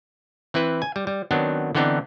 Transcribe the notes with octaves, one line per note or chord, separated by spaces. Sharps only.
E3 C4 E4 B4
G#5
G3
G3
D#3 F#3 B3 C4 D4
D3 E3 B3 C4 D4 D#4